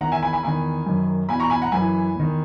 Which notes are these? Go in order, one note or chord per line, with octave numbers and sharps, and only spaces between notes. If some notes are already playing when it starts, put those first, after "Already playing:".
E2 D#3 F#5 A#5
E5 G#5
G#5 B5
G#5 B5
E2 D#3 G#5 B5
F#2 D#3
E2 B2 G#5 B5
A#5 C#6
G#5 B5
F#5 A#5
F#2 E3 G#5 B5
E2 D#3